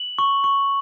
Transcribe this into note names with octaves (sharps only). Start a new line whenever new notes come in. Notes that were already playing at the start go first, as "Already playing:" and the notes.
Already playing: F#7
C#6
C#6